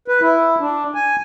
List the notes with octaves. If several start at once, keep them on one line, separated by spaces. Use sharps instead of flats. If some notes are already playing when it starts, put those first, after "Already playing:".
B4
E4
D4
G#5